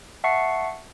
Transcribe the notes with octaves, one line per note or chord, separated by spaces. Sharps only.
E5 F#5 A5 C#6 C7 C#7